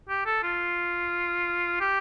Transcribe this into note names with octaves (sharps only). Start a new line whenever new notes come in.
G4
A4
F4
G4